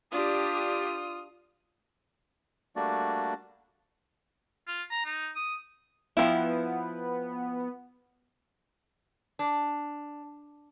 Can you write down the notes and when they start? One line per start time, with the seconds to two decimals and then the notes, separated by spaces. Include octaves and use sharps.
0.12 D4 F4 G4 D#6
2.76 G3 A3 A#3 D4 F#4 D5
4.67 F4
4.91 A#5
5.06 D#4
5.36 D#6
6.17 F3 B3 E4 E5 F5 G5
9.39 D4